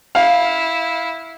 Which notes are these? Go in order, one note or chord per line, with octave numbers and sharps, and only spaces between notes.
E4 F5